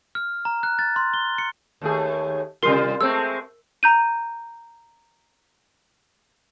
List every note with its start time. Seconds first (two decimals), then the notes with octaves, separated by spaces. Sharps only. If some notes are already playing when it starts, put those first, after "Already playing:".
0.15 F6
0.45 A#5
0.63 F#6
0.79 A6
0.96 C6
1.14 G7
1.38 C#7
1.82 D#2 A3 G#4
2.63 C3 G3 F4 A#4 C6 C7
3.01 G#3 A3 C4 E6
3.83 A#5 G6 D#7